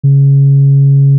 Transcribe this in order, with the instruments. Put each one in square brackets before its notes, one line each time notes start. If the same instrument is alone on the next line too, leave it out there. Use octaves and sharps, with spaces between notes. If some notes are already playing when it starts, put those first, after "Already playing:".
[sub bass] C#3